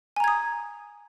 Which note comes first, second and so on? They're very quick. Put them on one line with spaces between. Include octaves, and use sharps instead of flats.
G#5 A#5 G#6 D#6